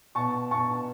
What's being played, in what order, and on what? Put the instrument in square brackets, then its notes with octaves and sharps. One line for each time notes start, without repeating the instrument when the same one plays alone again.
[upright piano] B2 A5 C#6
B2 A5 C#6